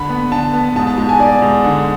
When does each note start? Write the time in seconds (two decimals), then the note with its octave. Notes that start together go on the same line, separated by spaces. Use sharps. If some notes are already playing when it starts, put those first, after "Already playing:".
Already playing: D3 B5
0.09 B3
0.31 D3 A5
0.54 B3
0.76 G#2 A5
0.87 A5
0.97 G#2 A5
1.09 G#5
1.19 G#2 D5
1.42 G#2
1.64 D3